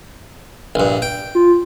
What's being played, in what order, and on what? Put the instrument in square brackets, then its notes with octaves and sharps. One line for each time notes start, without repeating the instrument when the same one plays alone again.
[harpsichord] A#1 G2
G5
[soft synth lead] F4